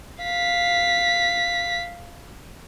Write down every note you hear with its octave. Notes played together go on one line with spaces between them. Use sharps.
F5 B6